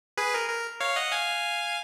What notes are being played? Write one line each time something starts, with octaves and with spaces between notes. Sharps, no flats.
G#4 B4
A#4
A#4
C#5 F5
D#5 F#5
F5 G#5